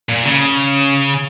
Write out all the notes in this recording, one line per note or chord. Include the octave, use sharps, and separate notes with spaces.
A#2
C#3